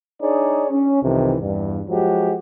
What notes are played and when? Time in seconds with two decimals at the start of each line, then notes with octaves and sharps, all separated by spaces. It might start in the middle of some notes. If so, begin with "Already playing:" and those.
0.22 D4 D#4 G#4 C#5 D5
0.71 C#4
1.03 C2 F2 C3 D#3 E3
1.41 E2 G2
1.89 F3 F#3 G#3 F#4 G4